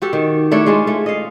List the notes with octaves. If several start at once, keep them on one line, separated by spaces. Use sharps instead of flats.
F#4 G4 A4
D#3
A3 D4 E4 C#5
G#3 C#4 F4
A3
D#5 F5